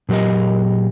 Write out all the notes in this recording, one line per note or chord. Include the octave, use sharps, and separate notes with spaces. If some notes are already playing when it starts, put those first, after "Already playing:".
A#2 F#3 G4 A#4 D#5